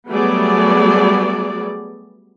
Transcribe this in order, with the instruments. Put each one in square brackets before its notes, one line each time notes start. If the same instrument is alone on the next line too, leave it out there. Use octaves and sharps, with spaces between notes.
[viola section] F#3 G3 A3 B3 G#4 D5